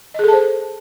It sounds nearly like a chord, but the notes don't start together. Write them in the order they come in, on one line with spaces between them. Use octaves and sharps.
D#5 G#4 A4 A5 C5